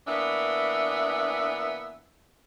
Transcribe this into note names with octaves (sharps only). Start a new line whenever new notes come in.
E3 A#3 B3 D4 E5